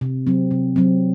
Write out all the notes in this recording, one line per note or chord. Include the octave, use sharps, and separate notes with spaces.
C3
F#3 C4
C3
F#3 C4